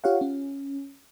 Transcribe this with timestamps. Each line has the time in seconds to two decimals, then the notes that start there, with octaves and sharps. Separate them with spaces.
0.04 F4 G4 C#5 F5 F#5
0.21 C#4